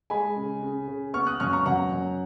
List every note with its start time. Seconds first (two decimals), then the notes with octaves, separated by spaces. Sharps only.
0.10 G#3 G#5 B5
0.36 C#3
0.63 C#3
0.88 C#3
1.14 B3 C#6 F6
1.27 D#6 F#6
1.40 F#2 C#6 F6
1.53 A#5 C#6
1.66 F#2 F#5 A#5
1.92 F#2